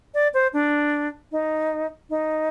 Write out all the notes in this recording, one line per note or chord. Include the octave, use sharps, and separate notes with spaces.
D5
C5
D4
D#4
D#4